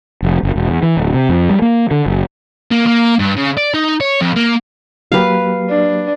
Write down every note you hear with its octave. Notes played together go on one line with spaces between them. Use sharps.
F1
F#1
E1
E2
E3
D1
C3
F2
G3
A#3
D3
F#1
A#3
A#3
G2
C#3
D5
D#4
C#5
F2
A#3
F#3 A#3 G4 B4 F5
D4